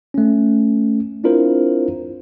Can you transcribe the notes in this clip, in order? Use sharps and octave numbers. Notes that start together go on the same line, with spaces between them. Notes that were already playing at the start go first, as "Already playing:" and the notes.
A3 C#4
C4 D4 E4 F4 A#4 C5